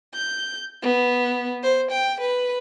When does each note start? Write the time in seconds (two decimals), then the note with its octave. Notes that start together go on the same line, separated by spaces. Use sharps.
0.14 G6
0.83 B3
1.63 C5
1.92 G5
2.21 B4